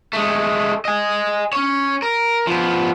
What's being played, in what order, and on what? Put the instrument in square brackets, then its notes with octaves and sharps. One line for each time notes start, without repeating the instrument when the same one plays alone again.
[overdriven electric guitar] G#3 A3
D#5 G#5
C#4 C#5
A#4
F3 B3